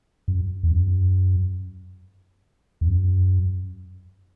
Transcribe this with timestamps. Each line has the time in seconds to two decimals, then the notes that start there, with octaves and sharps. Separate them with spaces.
0.28 F#2
0.63 E2
0.71 F#2
2.81 E2
2.87 F#2